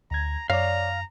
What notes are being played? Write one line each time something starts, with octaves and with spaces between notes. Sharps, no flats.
D2 A#5 G#6
F#2 C#5 D5 F5 A#5